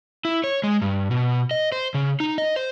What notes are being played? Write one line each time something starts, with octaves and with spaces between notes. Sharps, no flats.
E4
C#5
G#3
G2
B2
D#5
C5
C#3
D#4
D#5
C5